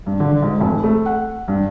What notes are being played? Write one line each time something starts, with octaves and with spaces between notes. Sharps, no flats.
G2
D3
G#2
F1
A3
F#5
G2